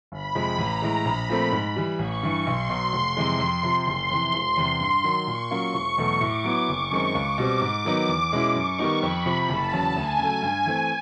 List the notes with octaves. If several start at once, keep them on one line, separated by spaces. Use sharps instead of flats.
G1 B5
F2 C3 F3 G#3
A1 A#5
A2 E3 G#3
A#1 B5
A#2 F3 A3 C4
G#2
E3 G3
A1 C#6
G2 E3
B1 C6
B2 F#3
F1
F2 C3 E3 G#3
F2
C3 F3
F#1 C6
F2 C3 E3
E1
E2 C3
G2
D#3 F#3
A#2 C#6
F#3 A#3 C#4 F4
E1 C#6
E2 B2 F#3 A3
A2 D6
F#3 B3 E4
F#1 C#6
F#2 D#3 G#3 C4
C#2 D6
B2 G3 C4
G#2 D6
D#3 F#3 B3 D#4
E2
B2 G#3 C#4 E4
F#2 C#6
D#3 G3 B3 D#4
F2 B5
C3 F3
F#1 A5
E2 C#3 F#3
D2 G#5
C#3 F#3 A3
G2 G#5
E3 A3 C4